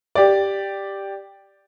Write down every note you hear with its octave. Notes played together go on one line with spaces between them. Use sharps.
G4 D5